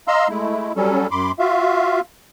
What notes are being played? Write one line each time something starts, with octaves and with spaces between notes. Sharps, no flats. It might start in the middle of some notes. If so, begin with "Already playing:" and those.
D#5 F5 A#5 C6 E6
G#3 A3 E4
F#3 G3 C#4 A4
F#2 B5 C6 D6
F4 F#4 E5 F5